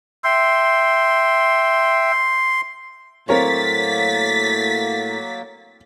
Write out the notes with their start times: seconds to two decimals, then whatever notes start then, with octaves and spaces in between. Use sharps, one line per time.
0.24 E5 G5 C6
3.29 A2 F#3 A#3 C4 A#4 C#5 A6 B6